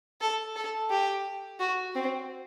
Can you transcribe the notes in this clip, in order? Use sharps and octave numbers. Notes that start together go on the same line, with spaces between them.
A4
A4
G4
F#4
C4